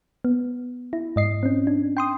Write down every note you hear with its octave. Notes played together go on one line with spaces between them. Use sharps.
B3
E4
G#2 D#5 C7
C4 C#4
D4
G5 C6 D#6